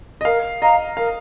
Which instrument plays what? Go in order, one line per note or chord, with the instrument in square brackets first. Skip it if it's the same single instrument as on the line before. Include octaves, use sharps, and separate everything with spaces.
[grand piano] D#5
[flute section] A#4 [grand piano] F5
[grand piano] D#5 [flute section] F5 A#5
[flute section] A#4 [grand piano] F5